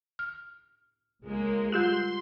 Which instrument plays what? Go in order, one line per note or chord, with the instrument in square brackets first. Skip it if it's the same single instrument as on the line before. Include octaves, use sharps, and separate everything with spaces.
[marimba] F6
[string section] C#2 G#3 A#3
[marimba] G3 F4 G4 [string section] C6